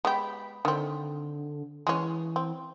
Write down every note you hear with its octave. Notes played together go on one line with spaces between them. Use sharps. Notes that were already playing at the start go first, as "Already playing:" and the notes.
G#3 B3 G4 B5
D3 D#3 C4
E3 G#3 C#4
C4